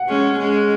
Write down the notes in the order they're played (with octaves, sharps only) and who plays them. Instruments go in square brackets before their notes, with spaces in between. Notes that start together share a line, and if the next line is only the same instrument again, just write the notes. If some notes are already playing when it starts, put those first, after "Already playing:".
Already playing: [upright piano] F#5
[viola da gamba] G#3 C#4
G#3 C#4